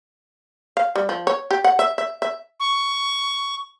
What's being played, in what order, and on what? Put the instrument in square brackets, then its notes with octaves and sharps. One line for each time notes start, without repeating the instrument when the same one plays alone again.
[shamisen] F5
G3
F3
C#5
G4
F#5
E5
E5
E5
[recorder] C#6